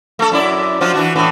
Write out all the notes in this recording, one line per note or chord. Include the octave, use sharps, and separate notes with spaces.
A3 A4
F#2 E4 D5
F3 F#3 F4
E3 D4 F#4
A2 E3